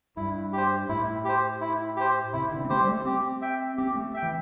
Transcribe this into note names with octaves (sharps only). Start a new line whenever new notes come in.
G2 E4
G4 C5
A2 E4
G4 C5
E4
G4 C5
C3 E4
D3
C4
A3 G4 C5
G3
A3
C4 G4
E5 G5
C4 G4
A3
E5 G5
E3